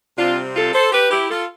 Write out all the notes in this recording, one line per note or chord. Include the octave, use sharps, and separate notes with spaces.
C3 G3 C4 D4 F4
F4 A4
A4 C5
G4 B4
E4 G4
F4 A4